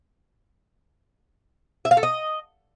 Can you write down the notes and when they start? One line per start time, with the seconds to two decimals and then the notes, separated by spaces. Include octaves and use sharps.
1.85 E5
1.91 F5
1.97 A4
2.03 D#5